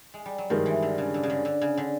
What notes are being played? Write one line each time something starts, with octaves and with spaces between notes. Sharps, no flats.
G#3
G3
F#3
G2 D#3 F3 G#3
E3
D3
C#3
D3
C#3
D3
D3
C#3
D3